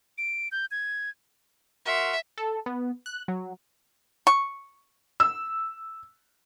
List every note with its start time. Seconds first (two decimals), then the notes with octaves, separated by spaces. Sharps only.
0.18 D7
0.52 G6
0.71 G#6
1.86 F#4 A#4 E5 C6
2.38 A4
2.66 B3
3.06 F#6
3.28 F#3
4.27 C#6
5.20 E6